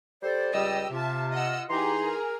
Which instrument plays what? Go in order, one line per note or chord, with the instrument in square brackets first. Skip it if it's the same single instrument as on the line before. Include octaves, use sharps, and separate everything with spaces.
[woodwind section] G3 A4 C5 [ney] D5
[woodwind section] C#2 G3 D#5 [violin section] G4 G5 E6
[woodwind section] C3 [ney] F4 [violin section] E5 A5
[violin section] D#5 F#5 E6
[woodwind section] E3 D#4 C6 [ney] G4 [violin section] G#4 A#5
[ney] A#4